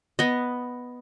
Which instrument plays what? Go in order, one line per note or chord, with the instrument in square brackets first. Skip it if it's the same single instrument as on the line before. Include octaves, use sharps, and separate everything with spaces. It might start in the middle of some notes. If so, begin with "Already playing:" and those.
[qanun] B3 D#5